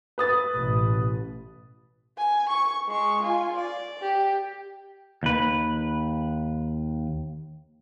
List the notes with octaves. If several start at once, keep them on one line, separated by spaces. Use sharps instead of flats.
B4 D#6 A6
A1 B2
G#5
C#6
G#3 C#6
F4 G#5
D5
G4
D#2 B4